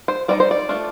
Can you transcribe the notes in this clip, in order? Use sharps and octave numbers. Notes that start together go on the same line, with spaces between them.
C5
G3 C4 D#4 D5
C5
D5
A3 D4 F4